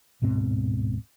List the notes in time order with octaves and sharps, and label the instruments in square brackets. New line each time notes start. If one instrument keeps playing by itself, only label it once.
[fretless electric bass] D1 G#2 B2 C4